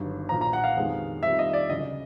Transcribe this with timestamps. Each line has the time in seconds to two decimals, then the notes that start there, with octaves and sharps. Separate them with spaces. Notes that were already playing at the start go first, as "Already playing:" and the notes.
Already playing: G1 G2 D#3 F#3
0.29 B1 A#2 F3 A#5
0.41 A#5
0.53 F#5
0.64 F5
0.77 F2 C3 D#3 G#3 B3
1.23 C3 D#3 G3 C4 F4 E5
1.39 D#5
1.53 D5
1.69 D2 C#3 F#3 D#5